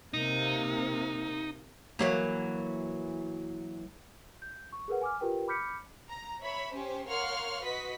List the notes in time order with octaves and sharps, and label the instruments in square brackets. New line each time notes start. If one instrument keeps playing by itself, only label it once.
[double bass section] C3 A#3 [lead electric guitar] D#4
[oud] E3 F#3 A#3
[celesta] G6
C#6
G#4 A#4 B4 F#5
G#5 D6 F6
F4 G4 A#4 B4 G5
B5 D6 F6 G6 B6 C#7
[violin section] A#5
C#5 E5 B5
C#4 G4 C5
A#4 C#5 F5 F#5 C6 F6
F#4 B4 D#5 B6